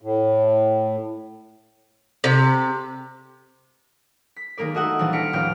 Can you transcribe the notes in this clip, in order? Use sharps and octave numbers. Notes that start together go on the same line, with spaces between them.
A2
C3
B6
D#3 G#3 A#3 A#4 D5
A3 D#4 F#4 D#5 E5 F#5
A#1 E3 G3 A6
F6 A#6 B6 C#7 D7
D#1 A1 F3 G5 F6 D7